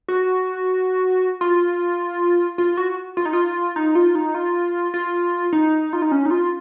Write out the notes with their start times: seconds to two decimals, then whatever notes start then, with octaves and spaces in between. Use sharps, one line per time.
0.08 F#4
1.41 F4
2.58 F4
2.77 F#4
3.17 F4
3.25 D#4
3.33 F4
3.76 D#4
3.95 F4
4.15 D#4
4.35 F4
4.94 F4
5.53 D#4
5.93 F4
6.02 D#4
6.12 C#4
6.26 D#4
6.31 F4